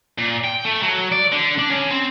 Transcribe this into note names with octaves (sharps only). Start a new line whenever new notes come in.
A#2
G5
A3
F#3
D5
D3
D4
C#3
C4